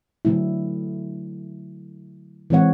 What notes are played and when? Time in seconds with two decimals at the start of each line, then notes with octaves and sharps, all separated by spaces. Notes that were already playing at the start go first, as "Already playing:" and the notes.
0.25 D3 F#3 A3 E4
2.50 E3 G#3 C4 C#5 F#5